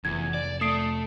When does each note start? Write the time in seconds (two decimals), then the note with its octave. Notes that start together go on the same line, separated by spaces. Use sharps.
0.05 F1 E2 G#6
0.34 D5
0.61 A3 D#6 C7 D7